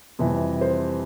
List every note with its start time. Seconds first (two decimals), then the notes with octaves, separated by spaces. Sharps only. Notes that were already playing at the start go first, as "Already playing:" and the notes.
0.19 F2 C3 E3 G3
0.61 C5